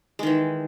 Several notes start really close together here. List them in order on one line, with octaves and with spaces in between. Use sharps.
G#3 D#3 E3